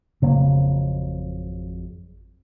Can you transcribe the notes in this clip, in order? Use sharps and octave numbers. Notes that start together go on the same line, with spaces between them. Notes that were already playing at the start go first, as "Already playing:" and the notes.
G#1 F2 C#3 F#3 A#3